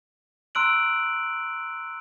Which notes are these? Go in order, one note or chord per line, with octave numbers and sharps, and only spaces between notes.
A#5 C6 E6 F#6 D7 F#7